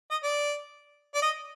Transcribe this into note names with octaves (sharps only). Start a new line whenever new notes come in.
D#5
D5
D5
D#5